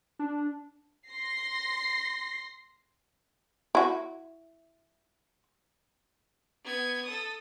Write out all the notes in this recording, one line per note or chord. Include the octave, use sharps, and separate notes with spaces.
D4
C6 A#6 C7
E4 F#4
B3 G#6
A4 D#6